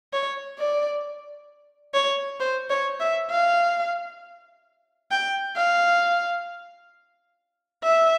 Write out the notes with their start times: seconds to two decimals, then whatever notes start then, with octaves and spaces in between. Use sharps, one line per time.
0.13 C#5
0.59 D5
1.94 C#5
2.40 C5
2.70 C#5
3.00 E5
3.30 F5
5.11 G5
5.56 F5
7.83 E5